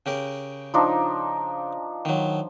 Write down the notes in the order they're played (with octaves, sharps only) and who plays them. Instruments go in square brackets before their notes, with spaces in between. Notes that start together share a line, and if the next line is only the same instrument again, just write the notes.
[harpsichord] C#3 G4 A#4
[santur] F3 D4 D#4
[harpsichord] D#3 F#3